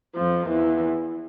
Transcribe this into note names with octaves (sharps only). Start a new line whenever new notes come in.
F2 F3
E2 E3